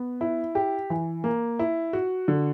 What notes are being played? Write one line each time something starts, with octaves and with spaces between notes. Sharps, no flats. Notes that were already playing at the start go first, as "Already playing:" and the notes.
Already playing: B3
E4
G4
E3
A#3
E4
F#4
D3